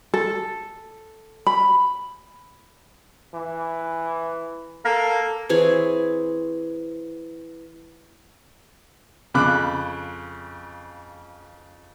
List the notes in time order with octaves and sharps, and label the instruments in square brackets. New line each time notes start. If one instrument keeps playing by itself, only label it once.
[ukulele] A4
B5
[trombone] E3
[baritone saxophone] A#3 [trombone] A4
[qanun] E3 C4 G#4 C#5
[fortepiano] F2 C#3 B5 D6 F#6